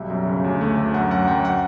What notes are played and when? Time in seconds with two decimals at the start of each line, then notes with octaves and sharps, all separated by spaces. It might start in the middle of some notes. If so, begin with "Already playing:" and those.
Already playing: B1 G3 E5
0.10 F#2
0.27 C#3
0.44 D2
0.61 A3
0.78 D2
0.94 F#2 F#5
1.11 F#2 F#5
1.28 F#2 G5
1.45 F#5